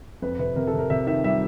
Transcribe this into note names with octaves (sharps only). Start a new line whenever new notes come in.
F2 B4
C3 B4
C3 A#4
A4
C3
A#4
C3 E5
D#3 E5
G3 E5